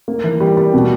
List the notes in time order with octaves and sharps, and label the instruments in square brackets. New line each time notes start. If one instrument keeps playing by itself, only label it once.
[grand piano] A#3
E3
G3
G3
B2